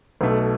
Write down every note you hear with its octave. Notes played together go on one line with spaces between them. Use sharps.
B1 B2 A3